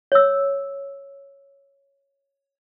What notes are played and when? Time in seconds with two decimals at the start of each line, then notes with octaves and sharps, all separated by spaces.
0.12 C#5 E6